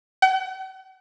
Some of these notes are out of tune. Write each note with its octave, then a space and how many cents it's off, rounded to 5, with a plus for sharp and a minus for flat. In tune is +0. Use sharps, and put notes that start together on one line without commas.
F#5 +45